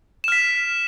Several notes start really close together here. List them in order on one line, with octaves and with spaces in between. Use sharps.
E7 F6 B6